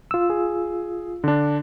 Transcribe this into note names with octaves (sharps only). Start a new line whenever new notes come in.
F4 E6
G#4
D3 D4